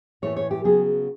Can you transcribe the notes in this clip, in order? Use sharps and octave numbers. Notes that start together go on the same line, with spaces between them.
A2 E3 A3 C#5
C#5
G4
C#3 F#3 B3 G#4